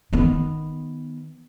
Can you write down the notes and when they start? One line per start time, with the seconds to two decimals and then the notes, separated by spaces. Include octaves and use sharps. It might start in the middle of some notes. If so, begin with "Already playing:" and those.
0.13 D#3 B3